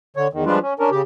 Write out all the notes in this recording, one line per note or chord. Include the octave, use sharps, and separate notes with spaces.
D3 C#5
E2 D#3
F3 G3 G#3 D4 F4 B4
C#4
C#4 D4 A#4
C#3 G4